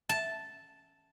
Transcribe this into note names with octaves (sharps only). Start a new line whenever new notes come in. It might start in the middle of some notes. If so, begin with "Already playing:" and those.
A5